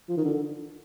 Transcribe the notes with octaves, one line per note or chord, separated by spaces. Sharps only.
F3
D#3
D3